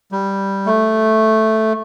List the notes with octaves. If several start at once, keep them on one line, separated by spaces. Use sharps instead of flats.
G3
A3